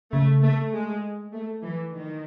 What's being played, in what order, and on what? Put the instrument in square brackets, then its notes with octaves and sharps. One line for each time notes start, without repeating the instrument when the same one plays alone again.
[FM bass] C#3 [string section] A3
[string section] A3
G#3
A3
E3
D#3